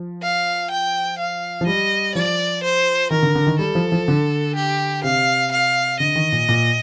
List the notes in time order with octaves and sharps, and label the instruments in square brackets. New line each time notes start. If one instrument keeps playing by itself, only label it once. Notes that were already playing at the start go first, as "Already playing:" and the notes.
Already playing: [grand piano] F3
[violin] F5
G5
F5
[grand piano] F3
[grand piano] G3 [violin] D#5
[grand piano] F3 [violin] D5
[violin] C5
[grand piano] D#3 [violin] A#4
[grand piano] D3
D3
D#3
[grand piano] G3 [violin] A4
[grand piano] F3
F3
D3
[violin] G4
[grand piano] C3 [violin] F5
[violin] F5
[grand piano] D3 [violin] D#5
[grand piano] D#3
A#2
A#2